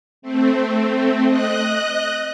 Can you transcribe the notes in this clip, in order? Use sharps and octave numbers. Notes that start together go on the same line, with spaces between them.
A3 C4
D#5 F#6